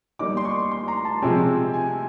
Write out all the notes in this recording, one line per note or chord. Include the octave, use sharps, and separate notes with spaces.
G3 A#3 D#4 D6
C6
C#6
C6
A#5
A5
C3 F3 G#3 C4 G#5
G#5